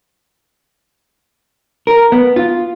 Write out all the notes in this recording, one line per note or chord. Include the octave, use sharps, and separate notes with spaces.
A#4
B3
F4